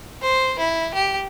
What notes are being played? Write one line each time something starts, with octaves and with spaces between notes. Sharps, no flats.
C5
E4
G4